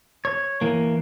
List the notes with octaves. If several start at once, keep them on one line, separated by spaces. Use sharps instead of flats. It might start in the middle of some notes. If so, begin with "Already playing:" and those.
C#5
E3 A#3